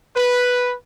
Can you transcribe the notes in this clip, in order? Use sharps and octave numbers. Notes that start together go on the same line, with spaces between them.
B4